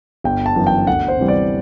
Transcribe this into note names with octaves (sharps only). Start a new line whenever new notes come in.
G1 G5
A5
F#2 E3
G5
D2 F#5
C5
C3 E3 G3
D5